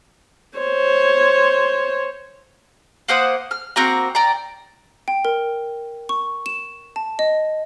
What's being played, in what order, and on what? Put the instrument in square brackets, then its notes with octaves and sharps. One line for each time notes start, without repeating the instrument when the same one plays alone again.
[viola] C5 C#5
[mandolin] A#3 C5 F#5 D#6
F6
A#3 C4 F#4 A#5
D5 G5 A#5
[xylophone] G5
A#4
C#6
E7
A5
D#5